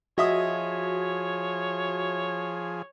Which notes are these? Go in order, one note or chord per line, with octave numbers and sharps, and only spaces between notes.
F3 F#4 G#4 C#5 D#5 E5 D#6